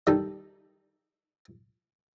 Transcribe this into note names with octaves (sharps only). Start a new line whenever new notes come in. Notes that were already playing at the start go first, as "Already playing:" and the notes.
D#3 G3 D#4 A4